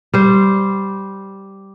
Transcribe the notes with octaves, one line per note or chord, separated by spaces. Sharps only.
G3 C5